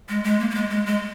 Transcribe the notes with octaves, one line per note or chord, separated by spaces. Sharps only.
G#3
G#3
A#3
A#3
G#3
G#3
G#3